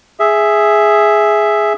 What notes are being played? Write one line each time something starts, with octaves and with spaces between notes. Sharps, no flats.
G#4 E5